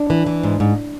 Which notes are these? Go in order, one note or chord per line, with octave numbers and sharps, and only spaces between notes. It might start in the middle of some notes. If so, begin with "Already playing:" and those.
Already playing: D4
E3
E3
G#2
G#2